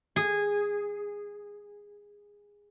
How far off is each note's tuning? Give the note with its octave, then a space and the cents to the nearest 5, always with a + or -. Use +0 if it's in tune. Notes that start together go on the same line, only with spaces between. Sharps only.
G#4 -15